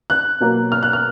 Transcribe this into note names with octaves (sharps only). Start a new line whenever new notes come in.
F#6
B2 F#3 A#3
F6
F#6
F6